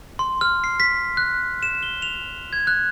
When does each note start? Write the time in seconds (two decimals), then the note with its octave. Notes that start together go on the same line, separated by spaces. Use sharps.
0.19 C6
0.41 F6
0.64 C7
0.80 B6
1.17 F#6
1.63 E7
1.83 G7
2.02 F7
2.53 G#6
2.67 F#6